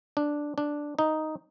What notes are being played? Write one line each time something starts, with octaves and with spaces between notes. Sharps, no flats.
D4
D4
D#4